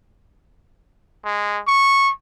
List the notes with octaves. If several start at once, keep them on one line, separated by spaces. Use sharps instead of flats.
G#3
C#6